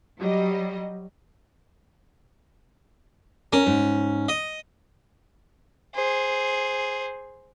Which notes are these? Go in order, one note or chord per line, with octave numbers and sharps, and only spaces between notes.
F#3 G3 D#5
C#4 A#4
G#2
D#5
G#4 C5